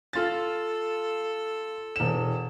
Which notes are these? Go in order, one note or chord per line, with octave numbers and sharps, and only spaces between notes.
F4 A4 A6
E1 E7